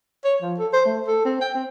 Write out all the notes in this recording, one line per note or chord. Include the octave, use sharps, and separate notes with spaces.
C#5
F3
A4
C5
A3
A4
C4
G5
C4